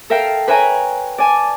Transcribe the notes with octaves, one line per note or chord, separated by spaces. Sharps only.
A4 A#4 E5 F5 G5
B4 C#5 E5 G5 G#5 A#5
D5 G#5 A5